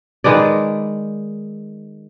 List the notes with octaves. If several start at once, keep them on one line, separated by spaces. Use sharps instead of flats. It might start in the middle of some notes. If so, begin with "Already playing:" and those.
D#3 G#3 B4 D5